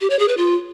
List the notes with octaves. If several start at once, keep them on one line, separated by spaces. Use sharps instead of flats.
G4
C#5
G#4
B4
F4